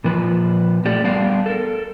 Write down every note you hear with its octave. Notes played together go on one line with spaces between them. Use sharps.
A#2 F3 B4
A3 G4 A4 D5
G3 B3 D4 D5 F5
A4 A#4